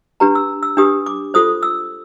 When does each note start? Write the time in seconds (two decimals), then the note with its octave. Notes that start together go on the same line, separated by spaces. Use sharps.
0.20 D4 G4 B4 A#5
0.35 E6
0.63 E6
0.77 D4 G4 B4 D#6
1.06 D6
1.34 F4 A4 C5 D#6
1.63 E6